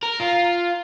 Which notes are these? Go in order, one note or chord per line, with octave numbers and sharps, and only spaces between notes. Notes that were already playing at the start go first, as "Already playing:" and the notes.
A#4
F4